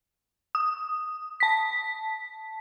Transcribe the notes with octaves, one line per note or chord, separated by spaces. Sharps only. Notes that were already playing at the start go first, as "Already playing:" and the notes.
D#6
A5 B6